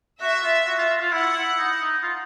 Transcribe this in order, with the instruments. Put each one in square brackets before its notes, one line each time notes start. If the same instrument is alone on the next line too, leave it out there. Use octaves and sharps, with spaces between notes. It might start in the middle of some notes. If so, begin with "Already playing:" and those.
[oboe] F#4 [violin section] E5
[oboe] F4
F#4
F4
F4
F4
[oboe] E4 [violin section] F#5
[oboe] E4
D#4
D#4
F4